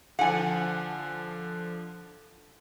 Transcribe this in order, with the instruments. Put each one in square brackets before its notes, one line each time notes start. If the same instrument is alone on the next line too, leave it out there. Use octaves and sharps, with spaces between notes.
[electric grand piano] D3 F3 [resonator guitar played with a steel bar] F#5 G#5